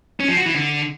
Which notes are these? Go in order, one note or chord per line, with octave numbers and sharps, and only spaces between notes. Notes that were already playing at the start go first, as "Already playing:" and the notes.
C#4
F3
F#4
E3
D3